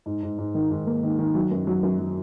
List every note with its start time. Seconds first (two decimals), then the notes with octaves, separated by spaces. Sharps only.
0.06 G#2
0.23 G#2
0.38 G#2
0.54 D#3
0.71 G#2
0.86 A#3
1.03 D#3
1.19 D#3
1.35 F#3
1.51 F#2
1.67 F#3
1.83 F#2
1.99 F#3